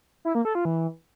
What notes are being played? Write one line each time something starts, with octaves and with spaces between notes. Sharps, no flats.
E4
A#3
A4
F4
E3